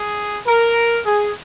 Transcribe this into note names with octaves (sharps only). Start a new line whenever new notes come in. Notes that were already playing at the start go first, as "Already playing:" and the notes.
Already playing: G#4
A#4
G#4